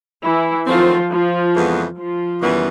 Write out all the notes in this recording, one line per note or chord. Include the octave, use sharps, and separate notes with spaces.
E3 E4
D#3 F3 F#3 A3 C4 F4
F3 F4
F2 C#3 E3 G#3 B3
F3 F4
F#2 C#3 E3 G3 B3